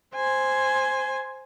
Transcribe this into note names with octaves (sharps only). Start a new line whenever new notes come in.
C5 G#5